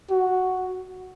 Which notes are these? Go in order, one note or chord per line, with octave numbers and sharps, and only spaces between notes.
F#4